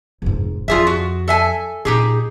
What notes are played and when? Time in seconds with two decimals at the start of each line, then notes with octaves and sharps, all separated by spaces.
0.22 F1 G#2
0.68 F2 F4 G#4 E5
0.87 F#4
1.28 A4 E5 G#5
1.85 A#2 D#4 G4 G#4